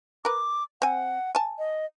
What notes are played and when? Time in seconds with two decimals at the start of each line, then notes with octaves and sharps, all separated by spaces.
0.25 A#4 B4 D6
0.82 C4 F#5 G#5
1.35 G#5 A5
1.58 D#5